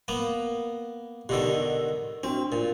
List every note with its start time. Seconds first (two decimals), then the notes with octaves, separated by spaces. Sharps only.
0.08 A#3 B3
1.29 B2 D3 D#3 G4 E6
2.23 C4 D4 F#4
2.52 A#2 A#4